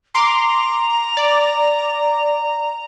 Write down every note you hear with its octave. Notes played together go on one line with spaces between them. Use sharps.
A#5 C6 D6
D5